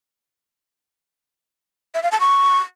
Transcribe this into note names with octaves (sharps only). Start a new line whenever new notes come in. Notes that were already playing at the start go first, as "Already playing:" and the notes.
E5
F5
A5
C#6